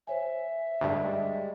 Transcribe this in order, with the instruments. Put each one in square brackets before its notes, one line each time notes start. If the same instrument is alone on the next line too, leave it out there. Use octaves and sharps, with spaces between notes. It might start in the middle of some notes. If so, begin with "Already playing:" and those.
[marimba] C5 C#5 G#5 [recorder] E5
[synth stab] D2 G2 [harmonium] G3 G#3